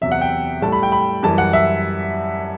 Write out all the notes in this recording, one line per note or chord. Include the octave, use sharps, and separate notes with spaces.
E2 C3 F#3 E5
F#5
G5
A2 G3 A5
B5
G5
B5
F#2 E3 G3 A5
F#5
E5